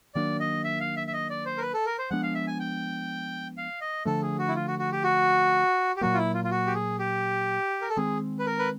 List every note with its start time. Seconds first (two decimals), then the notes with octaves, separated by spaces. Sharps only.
0.15 D#3 F#3 A#3 D4 D5
0.40 D#5
0.64 E5
0.80 F5
0.97 E5
1.07 E5
1.13 D#5
1.30 D5
1.45 C5
1.58 A#4
1.61 B4
1.74 A4
1.86 A#4
1.99 C5
2.10 F3 G#3 B3 D4 F#5
2.23 F5
2.35 E5
2.47 G#5
2.60 G5
3.57 F5
3.81 D#5
4.05 D3 F3 A3 D4 A4
4.22 G#4
4.39 F#4
4.48 E4
4.55 F4
4.68 F#4
4.79 F#4
4.92 G4
5.04 F#4
5.96 G4
6.01 A#2 F#3 A#3 F#4
6.14 F4
6.17 E4
6.34 F4
6.44 F4
6.51 F#4
6.66 G4
6.74 G#4
6.99 G4
7.81 A#4
7.89 A4
7.96 D#3 G#3 C4 G#4
8.39 B4
8.46 A#4
8.59 B4